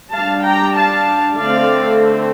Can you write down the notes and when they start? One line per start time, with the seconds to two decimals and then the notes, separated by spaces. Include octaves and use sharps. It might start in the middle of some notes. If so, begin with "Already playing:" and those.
0.14 G3 D4 F5 A5
0.46 G5 A#5
0.78 F5 A5
1.40 D3 A3 C4 D5 F5